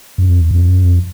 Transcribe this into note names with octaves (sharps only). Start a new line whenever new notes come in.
F#2
F2
E2
F2
F#2
F2